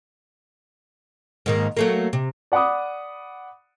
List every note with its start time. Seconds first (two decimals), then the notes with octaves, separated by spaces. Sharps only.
1.46 G#2 D#3 A#3
1.77 F#3 A3 A#3
2.13 C3
2.52 D5 F#5 B5 D6 D#6